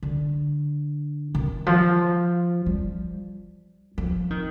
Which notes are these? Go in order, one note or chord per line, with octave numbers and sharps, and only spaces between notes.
D3
D#3
F3
G3
F3
D#3